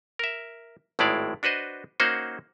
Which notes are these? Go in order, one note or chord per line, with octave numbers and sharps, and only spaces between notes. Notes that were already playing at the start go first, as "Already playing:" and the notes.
A#4 E5
G#1 A2 G#3 E4 D5 F5
D4 F#4 B4 C5 D#5
A#3 C#4 D#4 F#4 C5 F#5